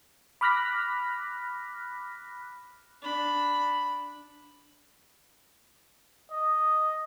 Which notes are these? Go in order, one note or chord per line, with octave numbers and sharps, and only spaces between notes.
B5 D6 F6 F#6 A#6 B6
D4 B5
D#5